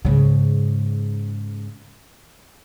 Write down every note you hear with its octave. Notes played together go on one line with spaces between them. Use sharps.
G#2 C#3